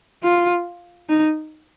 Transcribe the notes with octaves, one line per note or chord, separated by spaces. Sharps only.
F4
D#4